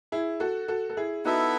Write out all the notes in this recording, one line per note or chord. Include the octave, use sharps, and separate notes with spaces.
E4 G#4
F#4 A4
F#4 A4
A4
E4 G#4
B3 D#4 E4 F#4 A4 E5